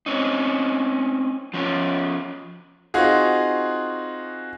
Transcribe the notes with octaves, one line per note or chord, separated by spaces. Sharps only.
C4 C#4 D#4
F3 C#4
C4 D#4 F4 F#4 G#4